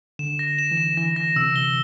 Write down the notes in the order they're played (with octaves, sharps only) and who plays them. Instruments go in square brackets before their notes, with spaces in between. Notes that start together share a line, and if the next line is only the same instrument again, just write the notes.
[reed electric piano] D3 [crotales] E7
[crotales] A#6
E7
[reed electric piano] E3
[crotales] E7
[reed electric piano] E3 [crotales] A#6
[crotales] A#6
[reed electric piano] C3 [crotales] E6
[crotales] G7